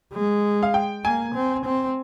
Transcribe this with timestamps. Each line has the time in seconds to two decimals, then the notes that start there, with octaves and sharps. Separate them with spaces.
0.13 G#3
0.63 F5
0.74 G5
1.04 A#3 G#5
1.35 C4
1.66 C4